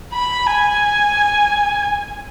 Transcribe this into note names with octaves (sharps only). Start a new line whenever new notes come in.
B5
G#5